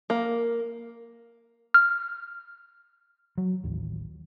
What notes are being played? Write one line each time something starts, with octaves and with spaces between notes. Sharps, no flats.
A#3
F6
F#3
A1 D#2